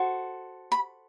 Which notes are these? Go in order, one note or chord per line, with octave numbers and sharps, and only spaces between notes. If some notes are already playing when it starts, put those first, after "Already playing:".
Already playing: F#4 A4 C5
B5